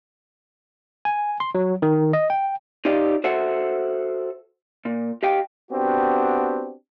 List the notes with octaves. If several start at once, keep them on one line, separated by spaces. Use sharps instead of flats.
G#5
C6
F#3
D#3
D#5
G5
D#4 F4 G4 D5 D#5 F5
F#4 A4 C5 E5 F#5
A#2
G4 D#5 F5 G5
B3 C4 D4 F#4 G4